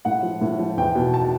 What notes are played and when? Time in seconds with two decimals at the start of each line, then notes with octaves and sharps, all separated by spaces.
0.05 A2 F#5
0.23 F3
0.41 A2
0.59 F3
0.77 E2 G5
0.95 B2
1.14 A5